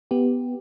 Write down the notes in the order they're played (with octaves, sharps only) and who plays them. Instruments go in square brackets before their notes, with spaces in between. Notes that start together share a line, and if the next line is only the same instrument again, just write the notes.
[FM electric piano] B3 G4